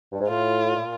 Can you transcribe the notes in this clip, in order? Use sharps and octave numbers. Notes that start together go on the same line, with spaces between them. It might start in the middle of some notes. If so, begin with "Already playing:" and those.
G2
G#2
A2 F4
A#2